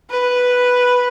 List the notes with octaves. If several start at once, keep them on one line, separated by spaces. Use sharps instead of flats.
B4